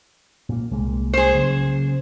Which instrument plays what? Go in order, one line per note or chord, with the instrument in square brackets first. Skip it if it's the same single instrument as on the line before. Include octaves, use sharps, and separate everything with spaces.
[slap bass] A#2 A#3
C2 G#3 A#3
[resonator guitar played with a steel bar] G#4 C5
[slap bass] C#3 F#3 A#3